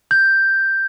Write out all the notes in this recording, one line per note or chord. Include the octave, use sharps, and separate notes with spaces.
G6